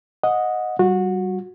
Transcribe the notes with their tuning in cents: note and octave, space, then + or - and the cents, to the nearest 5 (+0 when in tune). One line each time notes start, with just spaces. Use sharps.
D#5 +0 F#5 -20
G3 -35 F#4 -20